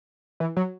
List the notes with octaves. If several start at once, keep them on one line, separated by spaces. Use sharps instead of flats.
E3
F#3